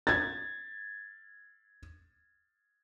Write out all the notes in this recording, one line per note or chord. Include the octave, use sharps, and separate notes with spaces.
G#6 A6